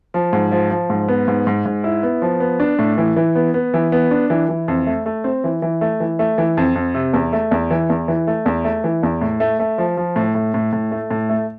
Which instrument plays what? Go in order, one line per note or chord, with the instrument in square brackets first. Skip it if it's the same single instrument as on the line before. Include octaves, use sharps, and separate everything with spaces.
[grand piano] F3
G#2
F3
F3
G#2
B3
G#2
G#2
G#2
E4
B3
F3
B3
D4
A2
E3
E3
B3
B3
E3
B3
D4
E3
E3
F2
A3
A3
C4
E3
E3
A3
E3
A3
E3
F2
F2
C3
E2
A3
E2
E3
E2
E3
A3
E2
A3
E3
E2
A2
A3
A3
F3
F3
A2
A2
A2
A2
A3
A2
A3